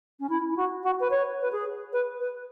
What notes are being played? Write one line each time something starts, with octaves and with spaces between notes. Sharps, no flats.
C#4
E4
E4
F#4
F#4
B4
C#5
B4
G#4
B4
B4